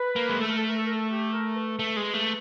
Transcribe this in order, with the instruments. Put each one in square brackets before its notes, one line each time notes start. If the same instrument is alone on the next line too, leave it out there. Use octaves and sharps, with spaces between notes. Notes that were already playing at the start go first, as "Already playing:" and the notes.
Already playing: [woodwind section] B4
[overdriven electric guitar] A#3
G#3
[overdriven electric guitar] A3 [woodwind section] A4
[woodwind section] A#4
A4
A#4
A4
A#4
A4
G4
A#4
B4
[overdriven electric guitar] A3
G#3
A3